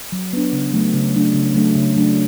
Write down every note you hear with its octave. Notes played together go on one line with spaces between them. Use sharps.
F#3
B3 D4
C#3
F#3 A3 D4
C#3
F#3 A3 D4
C#3
F#3 A3 D4
C#3
F#3 A3 D4